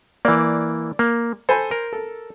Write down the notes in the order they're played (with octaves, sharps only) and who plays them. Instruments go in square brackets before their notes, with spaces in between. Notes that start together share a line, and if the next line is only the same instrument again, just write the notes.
[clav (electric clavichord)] E3 A#3 [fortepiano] D5
[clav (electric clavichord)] A#3
[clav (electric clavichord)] A4 [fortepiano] C5 G#5 B5
[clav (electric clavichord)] A#4
[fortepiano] A4